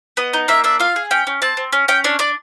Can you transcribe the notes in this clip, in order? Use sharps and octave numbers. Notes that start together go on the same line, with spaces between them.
B3 D#5
D#4
A#3 E5
D4 E5
F4 F5
G#4
C#4 G5
C#4
C4 A5
C4
C#4
C#4 G5
D4 C#5
D4 D5